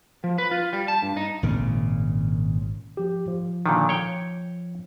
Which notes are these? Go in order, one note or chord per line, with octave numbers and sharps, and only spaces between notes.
F3
B4
F4
G3
A5
G2
D#4
G#1 A#2 C#3
F3 G4
F3
A#2 D3 D#3
C#5 G5